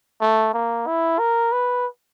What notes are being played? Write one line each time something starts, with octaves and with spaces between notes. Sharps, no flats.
A3
A#3
E4
A#4
B4